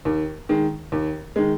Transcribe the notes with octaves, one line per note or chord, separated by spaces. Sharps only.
D#2
D#3 G#3
D#2
D#3 G#3